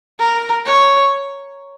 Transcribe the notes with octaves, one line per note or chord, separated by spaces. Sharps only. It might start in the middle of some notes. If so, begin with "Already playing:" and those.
A#4
C#5